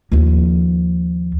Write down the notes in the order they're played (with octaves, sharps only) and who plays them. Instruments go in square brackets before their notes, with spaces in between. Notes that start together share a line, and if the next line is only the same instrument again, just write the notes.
[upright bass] D#2 F3